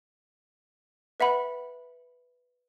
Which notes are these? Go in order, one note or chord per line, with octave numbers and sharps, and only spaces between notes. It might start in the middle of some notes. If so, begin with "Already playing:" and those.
B4 E5 F#5 B5